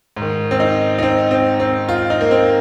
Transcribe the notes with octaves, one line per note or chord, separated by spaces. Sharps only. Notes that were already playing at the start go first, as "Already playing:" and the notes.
G#2
D#3
C4
D#4
D#4
C4
C4
C4
F4
D#4
A#3
C4